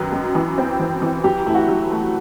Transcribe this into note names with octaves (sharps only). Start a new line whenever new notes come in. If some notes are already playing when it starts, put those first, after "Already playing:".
Already playing: F#2 D#3 F#3 B4
F#2
E3
C4
E3
E3
F#3 G4
A3 E4
F#4
F#3
A3